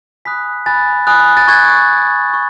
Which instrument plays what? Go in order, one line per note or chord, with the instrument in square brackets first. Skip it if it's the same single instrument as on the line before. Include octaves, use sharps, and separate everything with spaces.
[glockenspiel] G#5 B5 D#6 F#6 B6
G#5 B5 D#6 F#6 A6
G#5 B5 D#6 F#6
A6
C#6 F#6 G#6
C#6 F#6
C#6 F#6